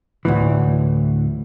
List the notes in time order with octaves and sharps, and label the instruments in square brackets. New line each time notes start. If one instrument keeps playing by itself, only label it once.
[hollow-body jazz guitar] D2 A2 E3